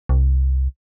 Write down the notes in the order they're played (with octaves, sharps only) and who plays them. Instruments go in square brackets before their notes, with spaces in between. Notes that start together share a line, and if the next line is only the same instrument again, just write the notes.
[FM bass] C2